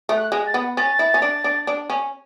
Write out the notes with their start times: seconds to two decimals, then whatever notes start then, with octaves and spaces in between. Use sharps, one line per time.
0.09 A3
0.17 F#6
0.32 G#3
0.47 A6
0.54 B3
0.77 C#4 A6
0.99 E4
1.14 C#4
1.22 D4
1.44 D4
1.67 D4
1.90 C#4